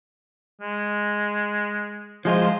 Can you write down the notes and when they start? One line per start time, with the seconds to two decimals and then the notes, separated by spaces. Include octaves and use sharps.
0.61 G#3
2.25 F3 G#3 F4 C5